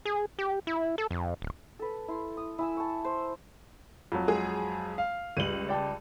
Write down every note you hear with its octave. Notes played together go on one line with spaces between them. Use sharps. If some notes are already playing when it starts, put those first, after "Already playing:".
G#4
G4
E4
A4
F2
D1
A4 B4
E4 C6
D#6
E4 G#5 E6
A5 C#6
C5
F2 F#3
G#3 G#4
F5
C#2 G3 D#7 F#7
D5 G5 A5